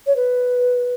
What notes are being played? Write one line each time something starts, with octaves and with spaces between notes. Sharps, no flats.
C#5
B4